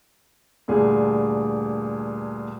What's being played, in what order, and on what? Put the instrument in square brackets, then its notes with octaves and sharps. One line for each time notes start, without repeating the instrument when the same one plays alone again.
[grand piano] D2 G2 A#2 G#4